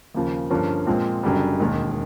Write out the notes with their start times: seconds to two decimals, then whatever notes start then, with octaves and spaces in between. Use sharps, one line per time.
0.15 D#2 C#3 F3
0.50 G2 D3 F3 A#3 C#4
0.87 A#2 F3 G#3 C4
1.23 F#1 F#2 D3 G3
1.60 E1 D#2 D#3 G#3